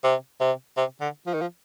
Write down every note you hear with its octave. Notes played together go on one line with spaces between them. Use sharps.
C3
C3
C3
D3
F3
D#3
F3